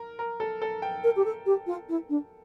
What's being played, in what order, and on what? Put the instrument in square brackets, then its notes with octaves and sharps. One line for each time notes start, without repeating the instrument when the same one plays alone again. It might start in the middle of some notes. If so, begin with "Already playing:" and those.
Already playing: [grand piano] A#4
A#4
A4
A4
G5
[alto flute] A#4
G4
A4
G4
F4
E4
D4